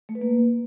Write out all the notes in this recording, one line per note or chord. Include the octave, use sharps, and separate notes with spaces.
A3
B4
A#3